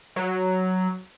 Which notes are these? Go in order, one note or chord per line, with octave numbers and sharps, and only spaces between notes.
F#3